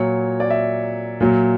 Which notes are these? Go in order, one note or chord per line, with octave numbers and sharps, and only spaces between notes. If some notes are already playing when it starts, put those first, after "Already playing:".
Already playing: A#2 F#3 C#5
D5
E5
A#2 F#3